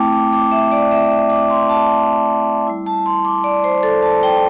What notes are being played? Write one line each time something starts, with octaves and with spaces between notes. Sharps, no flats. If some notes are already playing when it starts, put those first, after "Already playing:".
Already playing: A3 C4 E4 G5 A5 D6
D6
D6
E5
D5
E5
E5
D6
C6
A5
G3 E4
A5
C6
D6
D5
C5
A4
A5
G5